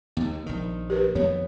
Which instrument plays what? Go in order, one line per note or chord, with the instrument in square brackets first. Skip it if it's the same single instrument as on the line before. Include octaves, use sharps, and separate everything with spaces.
[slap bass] D#2 [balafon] B3
[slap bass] A#1 D#3
[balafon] G4 A#4 B4
[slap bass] F2 D#3 B3 [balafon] C#5